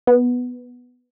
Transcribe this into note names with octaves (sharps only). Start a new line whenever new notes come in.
B3